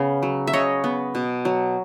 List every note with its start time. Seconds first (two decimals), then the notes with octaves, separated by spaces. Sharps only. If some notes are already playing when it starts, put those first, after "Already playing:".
Already playing: C#3 B3
0.23 F#3
0.47 E5
0.53 C#3 C#5 D#5
0.84 B3
1.15 B2
1.45 F#3